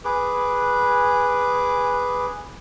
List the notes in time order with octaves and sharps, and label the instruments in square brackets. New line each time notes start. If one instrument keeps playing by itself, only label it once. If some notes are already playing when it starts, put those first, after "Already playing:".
[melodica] G#4 B4 D6